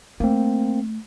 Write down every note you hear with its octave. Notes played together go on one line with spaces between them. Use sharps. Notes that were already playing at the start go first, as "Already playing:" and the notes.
A3 A#3 C4